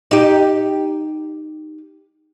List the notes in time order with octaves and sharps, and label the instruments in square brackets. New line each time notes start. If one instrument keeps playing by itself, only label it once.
[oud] D#4 G4